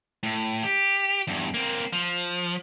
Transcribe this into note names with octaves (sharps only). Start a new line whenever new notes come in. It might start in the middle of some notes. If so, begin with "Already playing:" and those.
A2
G4
E2 G2
A#3 C4
F3